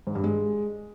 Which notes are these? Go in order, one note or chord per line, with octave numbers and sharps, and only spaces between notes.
G#2
G2
G#3